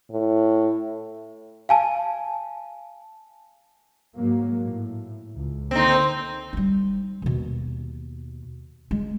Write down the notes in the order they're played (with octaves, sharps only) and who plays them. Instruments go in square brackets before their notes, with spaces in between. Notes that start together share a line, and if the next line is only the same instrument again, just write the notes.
[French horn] A2
[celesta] F5 G#5 A5
[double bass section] G#2 F#3 A#3
A2
C#2
[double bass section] D3 A#3 [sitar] C4 D#4
[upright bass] G3 D#4
D#2 B2
G#3